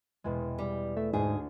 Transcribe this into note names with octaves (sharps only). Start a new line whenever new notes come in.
E1 E2 G#3
G3
A3 E5
D2 G#2 G#4